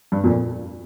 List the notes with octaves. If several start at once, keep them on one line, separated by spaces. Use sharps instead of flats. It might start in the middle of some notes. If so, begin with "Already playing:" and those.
G2
F2 A#2